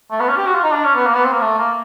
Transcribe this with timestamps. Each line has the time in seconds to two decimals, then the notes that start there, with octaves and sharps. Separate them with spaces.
0.11 A3
0.20 B3
0.28 C#4
0.37 G4
0.46 F#4
0.55 F4
0.63 D#4
0.72 D4
0.84 C#4
0.95 B3
1.06 A#3
1.15 B3
1.24 C4
1.33 A#3
1.41 A3
1.58 A#3